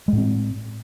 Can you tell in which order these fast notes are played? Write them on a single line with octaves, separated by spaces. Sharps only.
G#3 A2 C4